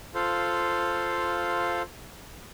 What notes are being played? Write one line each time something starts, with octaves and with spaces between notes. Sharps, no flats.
F4 A4 C5 F5